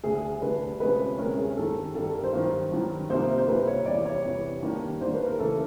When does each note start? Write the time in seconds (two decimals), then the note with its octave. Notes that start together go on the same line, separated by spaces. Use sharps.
0.04 D2 D3 G3 G#4
0.42 D2 D3 G3 B4
0.80 D2 C3 F3 G#3 C#4 B4
1.18 D2 C3 F3 G#3 C#4 A#4
1.38 G#4
1.56 G2 D#3 G3 A4
1.95 G2 D#3 G3 A4
2.14 A#4
2.24 C5
2.33 G2 D#3 F#3
2.71 G2 D#3 F#3
3.10 C2 C3 F3 A#3 D#4 C5
3.38 C5
3.48 C2 C3 F3 A#3 D#4 B4
3.67 C#5
3.86 E2 C3 E3 G3 B3 D5
4.05 C#5
4.25 E2 C3 E3 G3 B3
4.63 D#3 G3 A#3 D4
5.01 D#3 G3 A#3 D4 C5
5.14 B4
5.26 A#4
5.39 C#3 E3 A3 A4